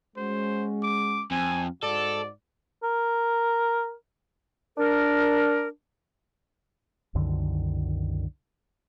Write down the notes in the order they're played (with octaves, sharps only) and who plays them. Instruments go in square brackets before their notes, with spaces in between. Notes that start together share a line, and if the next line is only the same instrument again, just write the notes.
[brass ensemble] G#3 C#4 F#4 [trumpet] C5
[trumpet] D6
[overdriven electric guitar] F2 [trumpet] G#5
[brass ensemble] G#2 F#4 [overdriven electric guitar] A4 [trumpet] D5
[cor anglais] A#4
[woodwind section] D4 A#4
[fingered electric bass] C2 F#2 D3 D#3